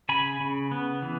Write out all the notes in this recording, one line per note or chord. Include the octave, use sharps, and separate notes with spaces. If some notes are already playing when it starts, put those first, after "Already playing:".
C#3 G#5 B5
C#3
B3
E3